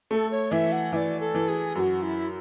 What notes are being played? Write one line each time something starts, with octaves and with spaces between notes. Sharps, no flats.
A3 A4
C#5
E3 E5
F#5
E3 D5 E5
A4
E3
G#4
F#2 F#4 G#4
E4